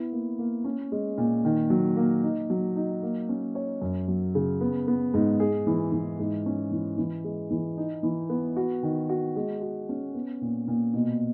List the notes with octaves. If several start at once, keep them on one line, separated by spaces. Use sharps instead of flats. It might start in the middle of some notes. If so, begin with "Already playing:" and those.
Already playing: B3 E4
A#3
A#3
C#4
G#3
A#2
D#3
F#3
A#3
D#4
F#3
D#4
A#3
C#4
C#5
F#2
F#3
C#3
B3
B3
G#2
G#4
E3
E3
G#2
C#4
E3
E3
G#3
E3
D#4
E3
B3
F#4
D#3
F#4
G#3
F#4
C#4
B3
A#2
A#2
B2